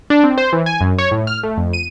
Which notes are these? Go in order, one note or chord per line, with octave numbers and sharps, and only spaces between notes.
D4
C4
C5
E3
G#5
F#2
C#5
A2
F6
A3
F2
D#7